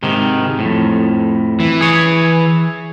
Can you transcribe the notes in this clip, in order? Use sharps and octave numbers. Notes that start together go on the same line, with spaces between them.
G#2 C3 D#3
F2 A2
E3
G#4 C#5